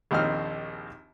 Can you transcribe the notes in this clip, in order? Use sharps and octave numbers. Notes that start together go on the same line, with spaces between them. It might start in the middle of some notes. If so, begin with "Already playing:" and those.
A#1 D#2 C4 D#4 F6